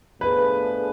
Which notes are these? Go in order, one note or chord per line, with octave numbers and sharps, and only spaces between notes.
A2 F3 B3 D4 G#4 B4